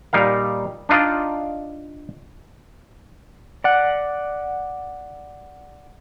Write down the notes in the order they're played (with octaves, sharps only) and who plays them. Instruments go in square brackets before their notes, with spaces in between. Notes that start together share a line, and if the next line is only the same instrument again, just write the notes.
[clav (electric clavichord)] A#2 G3 D#4 A#4 F5
D4 D#4 F4 D5 D#5
[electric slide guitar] D5 F#5